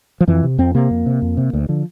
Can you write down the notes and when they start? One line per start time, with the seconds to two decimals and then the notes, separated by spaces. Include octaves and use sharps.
0.20 F3
0.27 F2 E3
0.43 C3
0.58 F2 C4
0.74 C3 A#3
0.90 F2
1.06 C3
1.22 F2
1.37 C3
1.53 D2
1.69 D3 F3